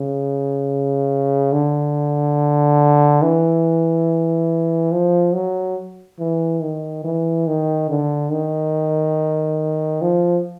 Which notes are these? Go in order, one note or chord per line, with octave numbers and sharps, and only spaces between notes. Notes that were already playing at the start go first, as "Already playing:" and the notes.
Already playing: C#3
D3
E3
F3
F#3
E3
D#3
E3
D#3
D3
D#3
F3